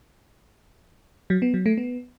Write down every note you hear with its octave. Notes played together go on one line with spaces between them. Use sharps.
F#3
B3
F#3
A3
B3